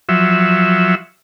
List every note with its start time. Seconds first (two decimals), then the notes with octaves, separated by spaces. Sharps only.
0.09 F3 F#3 E5